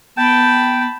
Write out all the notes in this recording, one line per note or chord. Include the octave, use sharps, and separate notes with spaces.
B3 G5 A5 B5